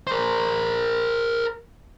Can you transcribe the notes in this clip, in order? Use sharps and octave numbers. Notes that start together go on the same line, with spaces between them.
A#4 C5